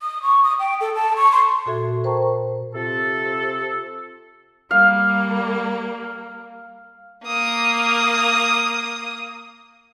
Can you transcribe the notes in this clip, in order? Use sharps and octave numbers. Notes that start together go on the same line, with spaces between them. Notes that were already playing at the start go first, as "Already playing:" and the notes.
D#6
C#6
D#6
G5
A4
A5
C#6
C6
A#2 F#4 A4 E5 G#6
A#4 C5 G5 A5 A#5 C#6
C3 F4 A4
G3 A#3 F5
A#3 D#6